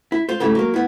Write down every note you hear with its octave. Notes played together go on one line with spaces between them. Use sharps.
E4
F4 C5
G#2 C#3 G3 A3 E4
F#3 A#3
B3 E4